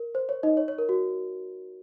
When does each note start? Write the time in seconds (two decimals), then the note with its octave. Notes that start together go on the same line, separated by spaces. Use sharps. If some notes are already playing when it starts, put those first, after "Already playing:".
Already playing: A#4
0.15 C5
0.29 C#5
0.43 D#4 D#5
0.57 C#5
0.68 C#5
0.78 A#4
0.89 F#4